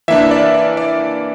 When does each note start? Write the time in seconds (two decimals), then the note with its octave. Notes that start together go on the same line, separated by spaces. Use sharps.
0.08 E3 A#3 D4 E5
0.31 D5
0.54 D5
0.77 D5